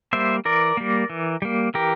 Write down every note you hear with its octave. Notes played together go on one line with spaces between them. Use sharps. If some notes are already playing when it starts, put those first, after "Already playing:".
G3 A#3 C5 E5
E3 A#4 D5
G3 A#3
E3
G3 A#3
E3 G4 A#4